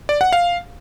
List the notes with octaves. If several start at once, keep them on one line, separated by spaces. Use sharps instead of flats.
D5
F#5
F5